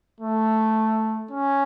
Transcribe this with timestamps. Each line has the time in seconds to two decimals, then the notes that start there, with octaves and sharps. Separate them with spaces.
0.20 A3
1.31 C#4